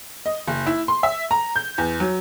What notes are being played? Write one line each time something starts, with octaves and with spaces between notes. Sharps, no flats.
D#5
F#1
E4
C6
E5
A#5
G6
E2
F#3